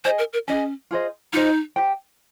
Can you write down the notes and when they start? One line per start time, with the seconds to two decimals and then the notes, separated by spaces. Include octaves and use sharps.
0.05 G#4 C5 D#5 G#5
0.19 A#4
0.33 A#4
0.48 C#4 G#4 D#5 G#5
0.91 F4 G#4 C5 D#5
1.33 D#4 F4 G#4 C5 D#5
1.76 G4 C5 G5